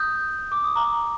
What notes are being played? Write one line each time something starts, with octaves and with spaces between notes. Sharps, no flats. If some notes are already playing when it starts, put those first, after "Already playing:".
Already playing: D#6 G6
D6
D#6
A#5 D6